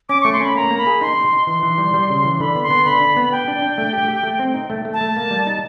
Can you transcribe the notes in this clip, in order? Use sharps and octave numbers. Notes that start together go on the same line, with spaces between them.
C#4 D6
A3 C#6
C6
C#4 B5
A#3 A#5
A#3
B5
G#4
D#4 C6
D#4
D#4
E3 C6
E3
G3
G3
C#3
E3
D3 B5
B3
C6
B3
D3 B5
D4
B3
G4 G5
D4
D4
A3
G4
G4
A3
C4
D#4
A3
A3
A5
A3
A#3
G3
D#4